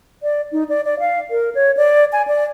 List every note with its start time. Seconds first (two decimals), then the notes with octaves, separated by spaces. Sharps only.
0.23 D5
0.52 D#4
0.69 D5
0.85 D5
1.00 F5
1.31 A#4
1.55 C#5
1.77 D5
2.12 G#5
2.27 D5